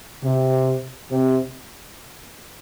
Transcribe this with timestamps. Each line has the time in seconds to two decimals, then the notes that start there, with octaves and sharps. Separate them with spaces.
0.24 C3
1.11 C3